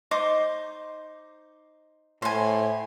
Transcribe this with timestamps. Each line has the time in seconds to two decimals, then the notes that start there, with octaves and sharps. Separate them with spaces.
0.11 D#4 C5 D6
2.22 A2 C5 G#5